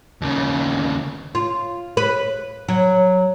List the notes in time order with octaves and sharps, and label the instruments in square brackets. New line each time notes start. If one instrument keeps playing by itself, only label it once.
[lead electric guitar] D#2 C#3
[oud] F4
B4
F#3